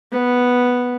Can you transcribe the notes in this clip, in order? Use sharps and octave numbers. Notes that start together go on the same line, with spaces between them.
B3